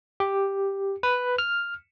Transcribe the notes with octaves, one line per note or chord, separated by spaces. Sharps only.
G4
B4
F6